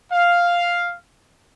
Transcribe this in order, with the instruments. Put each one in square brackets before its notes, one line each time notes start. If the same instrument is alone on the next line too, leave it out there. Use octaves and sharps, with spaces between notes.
[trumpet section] F5